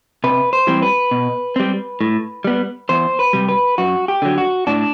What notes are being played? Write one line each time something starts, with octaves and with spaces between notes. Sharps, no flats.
C3 B4
C5
E3 G3 C4
B4
B2
G3 C4
A2
G3 B3
E2 C5
B4
C3 G3
B4
F#2 F#4
G4
D3 F#3
F#4
A2 D4